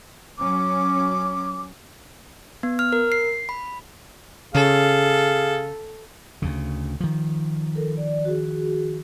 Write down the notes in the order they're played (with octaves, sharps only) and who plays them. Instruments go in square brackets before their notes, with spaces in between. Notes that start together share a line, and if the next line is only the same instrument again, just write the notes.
[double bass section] F#3 C#4 [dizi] D6
[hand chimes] B3
F6
A#4
C7
B5
[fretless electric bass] C#3 [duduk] G#4 [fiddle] A4 [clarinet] F5
[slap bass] D2 C#3
D#3 F3
[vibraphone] A4 A#4
D5
F#4 G#4